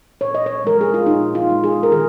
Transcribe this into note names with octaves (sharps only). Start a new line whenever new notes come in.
A#2 C#5
D#5
C#5
F3 G#3 A#4
G#4
F4
A#2 D#4
F4
F3 G#3
G#4
A#4
D#3 G#4